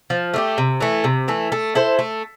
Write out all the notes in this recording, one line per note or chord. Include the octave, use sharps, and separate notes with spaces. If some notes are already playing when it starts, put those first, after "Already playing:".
F3
A3 D4 G4
C3
E3 A3
C3
E3 A3
A3
E4 A4 C5
A3